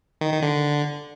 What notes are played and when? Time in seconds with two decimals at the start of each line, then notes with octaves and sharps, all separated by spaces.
0.21 D#3
0.32 D#3
0.42 D3